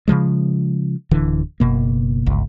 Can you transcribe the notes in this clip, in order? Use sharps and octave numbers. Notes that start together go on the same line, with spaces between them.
C#3 E3 F3 G#3
D1 D3 E3
F#1 B2 A#3
G1 C#2